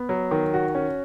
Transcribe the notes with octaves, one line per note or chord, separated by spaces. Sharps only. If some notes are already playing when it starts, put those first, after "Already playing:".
Already playing: B3
F#3
D#3
F#4
C#4